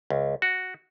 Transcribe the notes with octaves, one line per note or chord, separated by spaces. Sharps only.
C#2
F#4